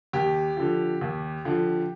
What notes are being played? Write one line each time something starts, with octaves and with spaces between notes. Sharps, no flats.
D#2 G4
D3 F3
D#2
D3 F3